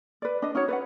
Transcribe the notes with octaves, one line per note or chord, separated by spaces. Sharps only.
B4 D5
D4 D#5
C#4 D#4 F#4 C#5
B4 D5 F#5